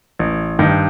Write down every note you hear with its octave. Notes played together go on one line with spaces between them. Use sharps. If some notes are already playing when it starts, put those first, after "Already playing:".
A1
G2 D#3